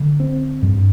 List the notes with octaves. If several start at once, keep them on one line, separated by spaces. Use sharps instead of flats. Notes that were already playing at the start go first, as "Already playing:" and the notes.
Already playing: D3
C4
G2